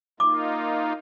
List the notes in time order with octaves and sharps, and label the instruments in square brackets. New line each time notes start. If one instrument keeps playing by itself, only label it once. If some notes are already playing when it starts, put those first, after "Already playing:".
[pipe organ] A#3 D#4 F4 [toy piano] D6